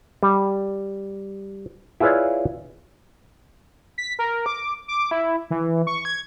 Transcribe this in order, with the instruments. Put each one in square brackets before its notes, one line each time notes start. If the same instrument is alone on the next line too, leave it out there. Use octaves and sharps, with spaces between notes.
[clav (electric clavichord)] G3
E4 F4 G#4 B4 C#5 D5
[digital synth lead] B6
A#4
D6
D6
E4
E3
C#6
G#6